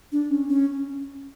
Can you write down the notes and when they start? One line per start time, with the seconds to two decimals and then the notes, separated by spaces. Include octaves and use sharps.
0.12 D4
0.30 C#4
0.49 C#4